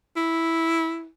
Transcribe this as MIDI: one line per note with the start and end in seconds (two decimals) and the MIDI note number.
0.16 1.07 64